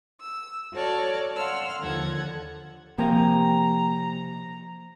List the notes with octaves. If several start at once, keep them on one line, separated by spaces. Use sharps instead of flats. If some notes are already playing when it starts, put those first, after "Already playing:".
E6
F#4 A4 C#5 D5 A5 F6
F5 F#5 C6 E6 F6
D#2 D3 F3 A4 F#5 G#6
C3 F3 A#3 A#4 F5 G5 G#5 A#5